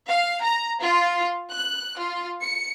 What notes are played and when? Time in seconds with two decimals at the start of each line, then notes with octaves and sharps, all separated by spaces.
0.10 F5
0.43 A#5
0.83 F4
1.53 F#6
1.97 F4
2.43 C#7